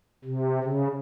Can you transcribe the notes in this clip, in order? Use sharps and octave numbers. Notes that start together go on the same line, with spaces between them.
C3
C#3